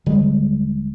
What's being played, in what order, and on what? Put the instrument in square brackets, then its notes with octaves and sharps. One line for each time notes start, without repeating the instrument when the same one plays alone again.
[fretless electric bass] D#1 D3 G3 G#3